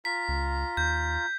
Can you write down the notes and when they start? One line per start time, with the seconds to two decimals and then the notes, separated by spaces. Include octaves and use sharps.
0.05 F4 A#5 B6
0.28 C#2
0.77 D#2 G6